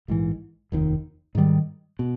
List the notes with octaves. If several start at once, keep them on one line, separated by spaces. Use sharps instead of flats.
A#1 G#2 E3
F1 D#2 D#3
G#2 D#3 G3
B2